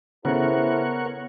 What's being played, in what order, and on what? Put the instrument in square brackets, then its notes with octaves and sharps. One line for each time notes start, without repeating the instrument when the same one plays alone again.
[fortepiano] C#3 [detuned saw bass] B3 [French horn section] E4 A4 C5 [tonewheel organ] A#4 C#5 F#5